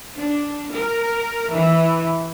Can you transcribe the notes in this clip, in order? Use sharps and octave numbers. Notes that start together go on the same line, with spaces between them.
D4
A#4
E3